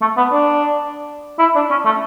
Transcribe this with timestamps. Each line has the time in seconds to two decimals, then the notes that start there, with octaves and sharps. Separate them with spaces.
0.01 A3
0.17 B3
0.32 D4
1.39 E4
1.55 D4
1.70 C#4
1.85 A3